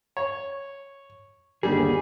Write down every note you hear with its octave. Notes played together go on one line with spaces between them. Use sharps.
C#5
G1 D#2 D3 G3 G#4